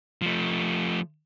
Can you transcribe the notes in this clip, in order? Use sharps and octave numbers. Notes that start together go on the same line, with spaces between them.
F3 A3